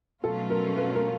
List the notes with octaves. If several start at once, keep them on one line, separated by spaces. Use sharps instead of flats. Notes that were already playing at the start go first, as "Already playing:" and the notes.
B2 F#3 A3 C#4 F4 A4
A#4
B4
A#4